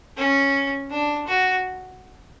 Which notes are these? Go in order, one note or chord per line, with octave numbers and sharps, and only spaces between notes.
C#4
D4
F#4